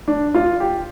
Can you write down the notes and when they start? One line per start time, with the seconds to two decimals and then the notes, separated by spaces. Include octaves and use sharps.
0.08 D4
0.34 F4
0.60 G4